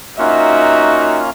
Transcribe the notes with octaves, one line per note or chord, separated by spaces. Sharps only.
A#3 C#4 D#4 F4 F#4 E5